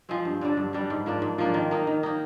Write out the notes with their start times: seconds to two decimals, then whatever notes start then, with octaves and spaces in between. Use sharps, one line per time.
0.09 F3 G#3 C4
0.25 G2
0.41 D3 G3 D4
0.57 G2
0.73 D3 G3 D4
0.90 G#2
1.06 F3 A#3 D4
1.22 G#2
1.38 F3 A#3 D4
1.54 D#3
1.71 A#3 D#4
1.87 D#3
2.03 A#3 D#4